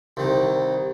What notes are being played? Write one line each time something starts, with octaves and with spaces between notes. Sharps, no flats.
C2 D#3